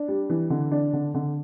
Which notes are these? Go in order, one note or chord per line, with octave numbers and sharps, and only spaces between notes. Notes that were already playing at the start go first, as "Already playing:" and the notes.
Already playing: D4
G3
E3
D3
D4
D3
D3